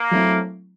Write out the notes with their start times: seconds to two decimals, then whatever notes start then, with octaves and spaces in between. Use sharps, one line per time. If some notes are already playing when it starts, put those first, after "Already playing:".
Already playing: A#3
0.11 F#3 A3 C4 E4